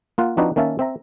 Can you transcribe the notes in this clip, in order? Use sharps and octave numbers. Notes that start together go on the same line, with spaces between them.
A#3 F4 F5 F#5
F3 C4 D4 D#4 F#4 B4
D#3 A#3 C#4 E5 F5 A5
C4 E5 A#5